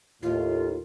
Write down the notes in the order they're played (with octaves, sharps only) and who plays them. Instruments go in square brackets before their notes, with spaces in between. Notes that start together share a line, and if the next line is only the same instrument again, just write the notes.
[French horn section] D#2 A2 [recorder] F4